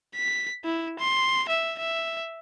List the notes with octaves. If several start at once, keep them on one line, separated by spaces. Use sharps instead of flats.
B6
E4
C6
E5
E5